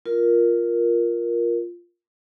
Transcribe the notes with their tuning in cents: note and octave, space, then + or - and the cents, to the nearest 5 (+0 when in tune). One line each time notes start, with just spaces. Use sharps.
F4 +0 A#4 +10